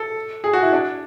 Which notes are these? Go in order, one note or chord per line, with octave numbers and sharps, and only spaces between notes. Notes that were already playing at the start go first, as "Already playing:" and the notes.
Already playing: A4
G#4
F#4
E4
D4